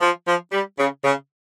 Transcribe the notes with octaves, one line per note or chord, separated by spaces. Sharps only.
F3
F3
G3
C#3
C#3